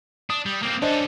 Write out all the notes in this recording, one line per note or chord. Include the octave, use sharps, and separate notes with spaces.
D4 D#6
G3
A#3 C4
C#4 D4 A4 C5 D#5